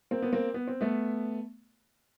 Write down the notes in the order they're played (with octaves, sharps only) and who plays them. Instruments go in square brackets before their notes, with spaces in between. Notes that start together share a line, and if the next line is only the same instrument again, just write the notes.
[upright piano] A#3 C4
B3
A#3 C4
B3
C4
A3 B3